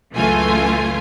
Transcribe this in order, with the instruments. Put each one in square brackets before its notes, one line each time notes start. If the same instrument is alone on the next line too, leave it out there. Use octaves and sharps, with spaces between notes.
[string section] C#2 F#2 E3 A3 F4 G#5